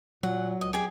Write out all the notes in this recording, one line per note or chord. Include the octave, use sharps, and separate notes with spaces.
A#2 F#3 F#5
C#2 D#5
G4 G#4 G#5